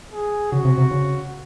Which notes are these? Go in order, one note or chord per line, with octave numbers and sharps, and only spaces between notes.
G#4
C#3 F#4
C3
C3
C#3